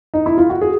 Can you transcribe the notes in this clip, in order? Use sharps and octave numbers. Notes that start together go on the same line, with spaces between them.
D#4
E4
F4
F#4
G#4